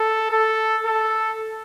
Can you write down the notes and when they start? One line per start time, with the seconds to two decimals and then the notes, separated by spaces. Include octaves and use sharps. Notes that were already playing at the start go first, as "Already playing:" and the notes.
Already playing: A4
0.31 A4
0.86 A4